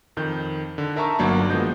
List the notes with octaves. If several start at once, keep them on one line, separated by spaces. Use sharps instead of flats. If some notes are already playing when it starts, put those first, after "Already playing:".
F2 D#3 G6
D3
D#4 A#4 E5 A5 A#5 C#6
G1 F#3 A#3 D4 B5 C#6
D#3 F3 G#3 B3 D#5 G6